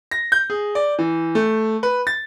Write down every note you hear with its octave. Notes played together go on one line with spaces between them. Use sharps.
A#6
G6
G#4
D5
E3
A3
B4
A6